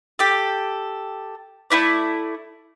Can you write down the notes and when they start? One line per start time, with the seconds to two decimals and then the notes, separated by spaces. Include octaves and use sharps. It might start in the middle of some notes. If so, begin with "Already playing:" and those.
0.19 G4 A4
1.70 A3 D4 E4 D5